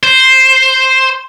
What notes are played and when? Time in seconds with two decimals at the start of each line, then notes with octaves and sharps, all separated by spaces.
0.03 C5